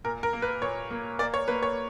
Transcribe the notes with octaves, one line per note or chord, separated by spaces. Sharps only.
A#2 A#4
A#4
A#3
B4
A#2 C#5
A#3
A#3 D5
C#5
A#3 B4
C#5